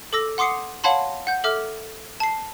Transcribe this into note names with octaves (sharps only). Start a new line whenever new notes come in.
A4 D6 E6 A#6
F#5 C6 D6 D#6 C7 C#7
C#5 F5 F#5 A5 B5 C6
F#5 G6
A4 E5 D6 F6
A5 C7